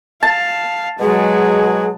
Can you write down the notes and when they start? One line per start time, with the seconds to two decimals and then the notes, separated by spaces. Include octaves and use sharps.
0.23 F5 A5
1.00 B2 F#3 G#3 G#4